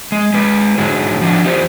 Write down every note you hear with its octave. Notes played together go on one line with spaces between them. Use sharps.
G#3
G#3 B4
G#2 D3 F#3 G#3
F3 D4 F#4
E2 F4 G4 C5 D5